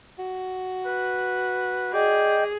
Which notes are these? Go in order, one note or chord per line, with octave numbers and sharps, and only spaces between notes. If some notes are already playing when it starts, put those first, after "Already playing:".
F#4
B4
G#4 D5 D#5 G5 G6